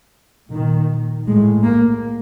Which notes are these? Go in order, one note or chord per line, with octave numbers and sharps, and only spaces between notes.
A#2 D#3
A2 G#3
A#3